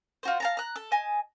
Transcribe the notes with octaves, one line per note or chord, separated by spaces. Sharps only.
F4 F#4 C5
F5 A5 A#5
A#5 F#6
A4
D#5 G#5 A5